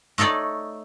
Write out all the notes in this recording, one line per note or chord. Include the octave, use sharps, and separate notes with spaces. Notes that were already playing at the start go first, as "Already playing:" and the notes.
A3 D#4 A4 C#5 D5